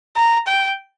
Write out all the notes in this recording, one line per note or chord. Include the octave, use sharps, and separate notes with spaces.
A#5
G5